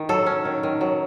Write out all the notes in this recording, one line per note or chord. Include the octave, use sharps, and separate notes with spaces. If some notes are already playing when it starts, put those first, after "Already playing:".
Already playing: D#3
F#3 A4
C#4
D#3
D#3
F#3